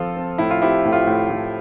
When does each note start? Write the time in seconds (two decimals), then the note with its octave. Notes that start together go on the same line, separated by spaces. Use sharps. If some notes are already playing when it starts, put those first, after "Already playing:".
Already playing: F3 C4 F4 A4
0.16 C4
0.38 A2 E4
0.51 F4
0.62 C4 E4 G4
0.85 A2
0.92 F4
1.07 A2
1.30 A2